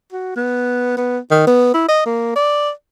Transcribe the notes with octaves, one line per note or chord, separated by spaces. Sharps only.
F#4
B3
B3
D#3
B3
E4
D#5
A#3
D5